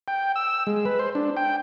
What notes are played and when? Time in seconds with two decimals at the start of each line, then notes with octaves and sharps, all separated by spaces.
0.08 G5
0.36 E6
0.67 G#3
0.85 B4
0.99 C5
1.15 D4
1.37 G5